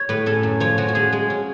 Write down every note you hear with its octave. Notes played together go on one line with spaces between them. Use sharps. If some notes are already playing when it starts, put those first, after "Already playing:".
Already playing: C#5
A2 B4
C#4 A4
F#2
F3 C#5
F3 F#4
F#4
C#4 G#4
G#3
C#4